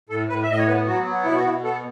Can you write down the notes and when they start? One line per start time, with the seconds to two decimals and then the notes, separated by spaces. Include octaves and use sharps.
0.09 A2 A4
0.28 A2 B4
0.43 E5
0.48 A2 D#5
0.58 C#5
0.67 B3 B4
0.86 F#3 F#4
1.06 B3
1.25 B2 E4
1.36 F#4
1.44 B2 E4
1.63 B3 A4